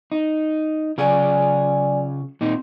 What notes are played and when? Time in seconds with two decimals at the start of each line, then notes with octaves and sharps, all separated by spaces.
0.12 D#4
0.98 C#3 F#3 F4 G#4 D5 G#5
2.41 A#2 C4 D#4